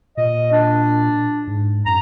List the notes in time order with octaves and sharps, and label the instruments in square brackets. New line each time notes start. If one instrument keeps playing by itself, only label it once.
[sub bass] A#2 [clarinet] D#5
[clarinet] D4
[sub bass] G#2
[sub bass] F#2 [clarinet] A#5